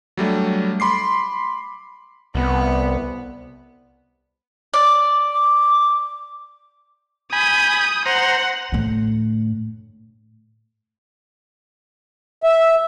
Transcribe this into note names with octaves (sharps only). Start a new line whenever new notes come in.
F#3 G3 A3 D4
B5 C6 D6 C7
C2 B3
D5
D6
G#5 B5 D#6 G6
C5 F#5 A#5
A2 D3
E5